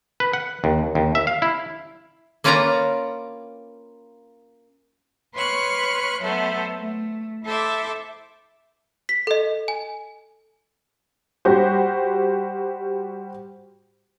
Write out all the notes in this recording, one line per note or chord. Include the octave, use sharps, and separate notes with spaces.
B4
F#5
D#2
D#2
E5
F5
E4
A#3 C#4 F4 B4 D5 A#5
B4 C#5 C6 C#6 F6 F#6
F#3 A3 B3 A4 C5 E5
A3
E4 A4 C5 E5 D6
B6
A4 D#5
G#5
G3 F#4 G4 C5